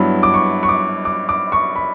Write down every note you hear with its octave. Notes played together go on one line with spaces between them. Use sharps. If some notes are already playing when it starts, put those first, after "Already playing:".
Already playing: G2 F#3 B3 E4
D6
C#6
C#6
D6
D6
D6
C#6
B5